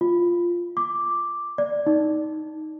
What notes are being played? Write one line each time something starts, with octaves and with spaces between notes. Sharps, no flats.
F4
D6
D5
D#4